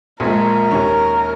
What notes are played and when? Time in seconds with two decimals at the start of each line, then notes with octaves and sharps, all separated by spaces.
0.20 A#1 A#2 F3 G#3 A#4
0.71 D#2 D#3 C#4